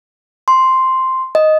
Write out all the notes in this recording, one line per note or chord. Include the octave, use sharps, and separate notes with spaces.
C6
D#5